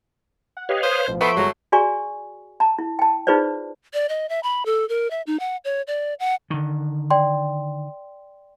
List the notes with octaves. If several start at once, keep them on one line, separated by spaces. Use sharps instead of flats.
F#5
G4 B4 C#5 D#5 F5
C5 D#6
A1 B2 F3
A3 B3 B5 C6 E6 D7
G1 F#3 G#3 A#5
F#4 G#4 D5 G#5 A#5 C#6
A5 A#5
E4
G5 A5
D#4 F4 G#4 B4 C5 D5
D5
D#5
E5
B5
A4
A#4
E5
D#4
F#5
C#5
D5
F#5
D3 D#3
D5 G5 C6